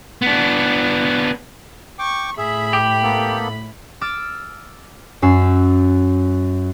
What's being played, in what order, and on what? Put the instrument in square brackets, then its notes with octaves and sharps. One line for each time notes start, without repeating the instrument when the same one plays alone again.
[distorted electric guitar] B3 D4
[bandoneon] G5 D6 [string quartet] C#6
[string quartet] A2 B5 [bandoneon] G#4 E5
[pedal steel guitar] G4
[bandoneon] A#3 B3 A4
[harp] D6 E6 F6 A6
F#2 C#4 E6 C7